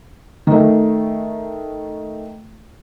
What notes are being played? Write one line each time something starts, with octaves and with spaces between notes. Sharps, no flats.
D#3 A3